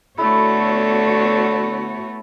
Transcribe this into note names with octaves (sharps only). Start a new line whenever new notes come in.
D3 A3 B3 E4 F#4 C#5